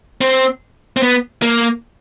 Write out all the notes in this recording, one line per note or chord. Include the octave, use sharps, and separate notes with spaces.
C4
C4
B3
A#3